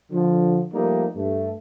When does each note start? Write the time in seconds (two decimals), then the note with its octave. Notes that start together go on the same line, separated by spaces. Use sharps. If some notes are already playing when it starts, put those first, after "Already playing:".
0.11 D3 F3
0.74 F3 G3 A3 A#3 D#4
1.16 G2 A3